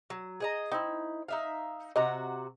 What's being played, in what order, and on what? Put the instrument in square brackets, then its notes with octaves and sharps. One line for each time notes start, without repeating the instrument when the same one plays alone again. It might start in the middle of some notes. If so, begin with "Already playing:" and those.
[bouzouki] F#3
G#4 D#5 A#5
[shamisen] C4 [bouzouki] D#4 E4
[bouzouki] D#4 E5 F5
[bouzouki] C3 F#4 A#5 [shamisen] D#5